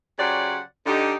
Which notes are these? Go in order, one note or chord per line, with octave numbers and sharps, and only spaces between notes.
C#3 F#3 G4 C5 D5 F#5
D3 D#4 G4